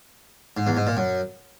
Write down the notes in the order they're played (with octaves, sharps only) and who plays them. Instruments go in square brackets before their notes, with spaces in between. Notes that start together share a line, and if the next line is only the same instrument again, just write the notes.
[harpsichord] G#2
E2
G#2
A#2
F#2